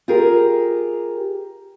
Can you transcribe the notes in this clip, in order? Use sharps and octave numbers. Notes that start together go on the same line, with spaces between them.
F4 G4 G#4 A#4